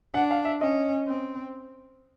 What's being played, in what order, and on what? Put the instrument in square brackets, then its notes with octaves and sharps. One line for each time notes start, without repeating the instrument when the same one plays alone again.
[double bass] D4 [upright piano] F#5
[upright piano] F5
E5
[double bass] C#4 [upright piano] D#5
[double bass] C4